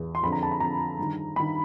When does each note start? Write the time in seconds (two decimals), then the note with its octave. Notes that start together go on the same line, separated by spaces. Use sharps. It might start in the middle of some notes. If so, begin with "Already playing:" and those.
Already playing: E2
0.15 C6
0.23 F2 D3 B5
0.32 A#5
0.43 A5
0.52 B5
0.60 F2 D3 A#5
0.99 G2 D#3
1.36 G2 D#3 B5